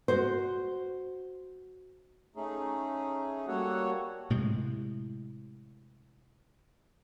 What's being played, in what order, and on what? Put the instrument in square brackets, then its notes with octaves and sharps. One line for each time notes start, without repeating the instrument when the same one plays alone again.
[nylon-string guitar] F#4 C5
[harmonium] A3 C#4 D#4 G#4
G3 A#3 F#4 A4 C#5 F#5
[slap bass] A2 C3 G#3